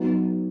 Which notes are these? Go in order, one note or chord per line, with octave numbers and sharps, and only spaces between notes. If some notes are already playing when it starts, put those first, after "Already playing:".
Already playing: F#3 B3 D#4